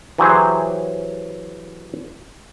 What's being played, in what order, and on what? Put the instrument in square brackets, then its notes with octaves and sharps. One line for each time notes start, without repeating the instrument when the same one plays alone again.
[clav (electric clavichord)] E3 F#3 G4 G#4 C5 C#5